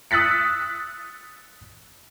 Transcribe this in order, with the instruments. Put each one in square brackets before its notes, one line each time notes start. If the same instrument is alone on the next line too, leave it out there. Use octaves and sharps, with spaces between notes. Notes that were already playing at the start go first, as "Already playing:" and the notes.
[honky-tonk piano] D#6 E6 F#6 A6 B6 C#7